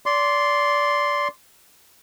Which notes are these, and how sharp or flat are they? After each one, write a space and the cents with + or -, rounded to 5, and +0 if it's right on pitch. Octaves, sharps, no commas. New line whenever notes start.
D5 -20 C6 +0